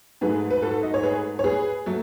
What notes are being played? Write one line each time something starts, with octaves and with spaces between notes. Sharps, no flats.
G#2 F#3 A3 G#4 B4
B4
F#4 A4
D#5
C#5
G#4 B4
C#5
G#4 B4
F#3 A3